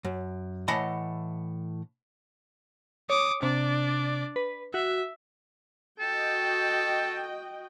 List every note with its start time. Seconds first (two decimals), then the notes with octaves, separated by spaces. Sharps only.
0.05 F#2
0.68 A2 E3 D#5 F#5 A5 B5
3.10 C#5 D6 D#6
3.43 C3 D4 D5
4.36 B4
4.74 F#4 E5
5.99 F#4 A4 D#5 G5